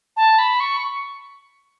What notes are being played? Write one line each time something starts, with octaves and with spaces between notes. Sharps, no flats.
A5
B5
C#6